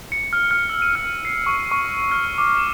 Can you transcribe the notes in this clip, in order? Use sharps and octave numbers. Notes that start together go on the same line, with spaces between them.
C#7
F6
F6
E6
D#7
F6
C7
C#6
C#6
F6
D6
E7